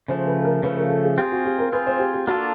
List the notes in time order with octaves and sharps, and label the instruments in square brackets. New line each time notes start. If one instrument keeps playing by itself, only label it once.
[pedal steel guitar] C#3 F3 A3 [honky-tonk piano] C5
[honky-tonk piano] B4
A4
A#4
[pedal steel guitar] C#3 F3 A3 [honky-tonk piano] B4
[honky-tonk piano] A#4
A4
G#4
[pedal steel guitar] C4 F4 G#4 [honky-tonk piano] G4
[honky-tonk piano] F#4
G4
A#4
[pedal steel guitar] C4 F4 G#4 [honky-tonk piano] B4
[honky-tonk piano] C5
G4
G4
[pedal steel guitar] A#3 D4 F4 A4 [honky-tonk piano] F#4